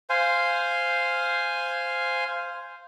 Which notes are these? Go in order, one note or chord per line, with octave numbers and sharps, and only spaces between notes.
C5 F5 G#5